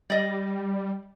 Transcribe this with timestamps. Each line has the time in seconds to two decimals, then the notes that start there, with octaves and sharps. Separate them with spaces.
0.10 G3 D5 D#5